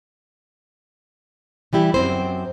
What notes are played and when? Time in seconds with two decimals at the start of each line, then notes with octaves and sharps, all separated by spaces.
1.73 E3 G3 E4 G4
1.94 F#2 C4 C5